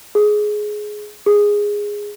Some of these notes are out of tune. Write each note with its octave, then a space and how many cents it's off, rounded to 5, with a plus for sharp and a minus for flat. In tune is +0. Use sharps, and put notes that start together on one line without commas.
G#4 +15
G#4 -10